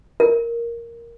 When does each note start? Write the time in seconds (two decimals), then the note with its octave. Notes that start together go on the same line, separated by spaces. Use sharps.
0.20 A#4